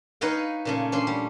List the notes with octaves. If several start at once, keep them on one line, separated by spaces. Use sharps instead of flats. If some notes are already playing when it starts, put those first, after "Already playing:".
D#4 B4 C#5 D#5 F5 G5
A#2 C#3 A3
C#4 D4 C6
G3